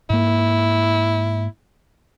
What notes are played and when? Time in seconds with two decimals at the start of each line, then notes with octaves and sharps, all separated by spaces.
0.10 G#2 A#3 E4